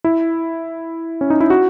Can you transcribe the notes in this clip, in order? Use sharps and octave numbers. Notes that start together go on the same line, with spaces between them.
E4
C#4
D#4
E4
F#4